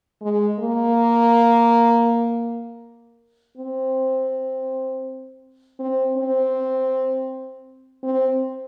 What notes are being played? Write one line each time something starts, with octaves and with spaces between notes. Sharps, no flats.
G#3
A#3
C4
C4
C4
C4